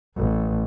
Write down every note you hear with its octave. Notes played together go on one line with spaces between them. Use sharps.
A1